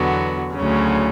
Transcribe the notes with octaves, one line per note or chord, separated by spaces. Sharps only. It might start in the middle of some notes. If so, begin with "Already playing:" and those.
Already playing: E2 D3 F#3 B3 F#4
D2 C#3 F#3 C#4